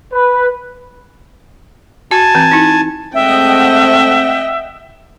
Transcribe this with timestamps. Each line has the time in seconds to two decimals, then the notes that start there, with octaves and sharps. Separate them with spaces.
0.12 B4
2.11 F#4 G#5 A5
2.35 E3 C4
2.51 D#4 E4
3.14 G#3 A3 C4 D#5 E5 F#5 G5